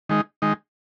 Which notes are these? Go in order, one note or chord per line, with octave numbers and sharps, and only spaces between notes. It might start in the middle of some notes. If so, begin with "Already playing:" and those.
D#3 G#3 D#4
D#3 G#3 D#4